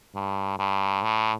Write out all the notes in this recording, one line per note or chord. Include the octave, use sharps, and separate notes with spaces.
G2
G2
A2